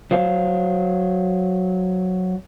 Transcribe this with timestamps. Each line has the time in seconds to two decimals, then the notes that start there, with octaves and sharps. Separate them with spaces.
0.11 F#3 C5 F5